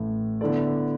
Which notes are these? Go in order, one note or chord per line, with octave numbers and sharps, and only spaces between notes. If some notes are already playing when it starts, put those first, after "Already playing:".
Already playing: A1 A2 A3
D3 B3 E4 A4 D5